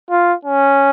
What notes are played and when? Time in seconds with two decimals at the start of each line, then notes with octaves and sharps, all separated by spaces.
0.10 F4
0.45 C#4